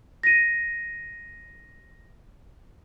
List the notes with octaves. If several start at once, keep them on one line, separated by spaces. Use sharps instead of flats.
A#6 D#7